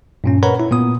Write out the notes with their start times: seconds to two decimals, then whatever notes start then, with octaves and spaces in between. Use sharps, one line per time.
0.24 G2 A#2 C#4
0.43 A#4 B4 C#5 F#5 A#5 B5
0.60 E4
0.71 A#2 B3 D#6